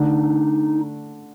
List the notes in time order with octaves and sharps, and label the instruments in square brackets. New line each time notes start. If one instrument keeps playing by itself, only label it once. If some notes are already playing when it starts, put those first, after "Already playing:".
Already playing: [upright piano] D3 A3 D4 [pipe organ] D#4